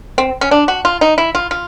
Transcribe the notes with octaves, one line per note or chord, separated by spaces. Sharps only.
C4
C#4
D4
F#4
F4
D#4
E4
F4
F4